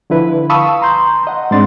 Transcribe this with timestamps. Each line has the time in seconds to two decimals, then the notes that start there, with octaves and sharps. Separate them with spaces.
0.10 D3 F3 E4 B4
0.50 F5 A5 B5 C#6 D#6 E6
0.81 A#5 C6 G6
1.27 D#5 F#5
1.51 G#2 C4 D4 D5 C6 A6